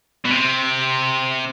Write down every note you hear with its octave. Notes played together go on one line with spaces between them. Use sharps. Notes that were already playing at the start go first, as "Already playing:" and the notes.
B2
C3